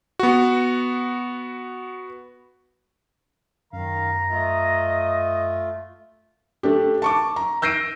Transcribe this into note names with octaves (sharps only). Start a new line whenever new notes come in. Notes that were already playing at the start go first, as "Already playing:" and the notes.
B3 F#4
F#2 D#3 F5 A#5
A3 F4 D#5
A3 D4 G4
A5 C#6 D6
A#5
E6 G6 A#6 C7 D7 D#7